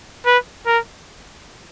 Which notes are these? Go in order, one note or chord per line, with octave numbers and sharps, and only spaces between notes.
B4
A#4